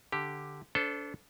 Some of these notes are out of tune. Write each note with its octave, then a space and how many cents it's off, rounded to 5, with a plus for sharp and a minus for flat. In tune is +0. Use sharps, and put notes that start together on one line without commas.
D3 +0 G4 +0
D4 -35 A4 +0 C5 -25